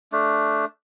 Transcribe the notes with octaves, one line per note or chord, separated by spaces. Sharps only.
A3 D4